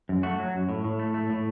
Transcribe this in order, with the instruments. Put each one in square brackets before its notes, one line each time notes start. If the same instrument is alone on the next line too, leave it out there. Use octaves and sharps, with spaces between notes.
[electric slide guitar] F#2
A3 F#4
F#3
F#2
A2
A2
A3
A3
A2